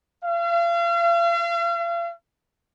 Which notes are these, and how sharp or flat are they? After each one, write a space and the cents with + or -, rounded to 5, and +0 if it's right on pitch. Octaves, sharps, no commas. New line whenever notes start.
F5 -40